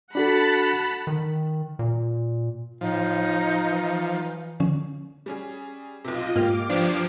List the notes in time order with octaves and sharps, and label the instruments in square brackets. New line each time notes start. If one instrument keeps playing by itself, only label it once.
[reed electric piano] D4 F#4 A4 [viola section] F#5 A5 B5
[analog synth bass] D#3
A#2
[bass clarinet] A2 [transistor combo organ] F3 [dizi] D#4
[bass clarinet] E3
[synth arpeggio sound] D3 F3 C#4
[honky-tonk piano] G3 C#4 G#4
[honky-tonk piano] B1 C3 [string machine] F4 D#5
[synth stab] G#2 A#3 [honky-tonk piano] F4 G4 [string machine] D6
[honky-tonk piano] G1 F4 G4 [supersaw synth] F3 [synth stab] D4